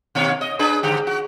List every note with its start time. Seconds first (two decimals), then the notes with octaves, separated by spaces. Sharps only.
0.15 D#2 B2 C#5
0.41 D#5
0.59 D4 G#4 B4
0.83 G#2 D3 G4
1.07 F#4